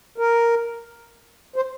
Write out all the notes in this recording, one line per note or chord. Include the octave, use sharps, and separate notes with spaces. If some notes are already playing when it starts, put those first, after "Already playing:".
A#4
C5